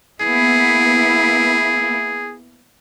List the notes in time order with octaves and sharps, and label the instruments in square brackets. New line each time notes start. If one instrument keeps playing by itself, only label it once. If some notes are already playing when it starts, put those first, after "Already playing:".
[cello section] A#3 B3 E4 [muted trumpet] G#4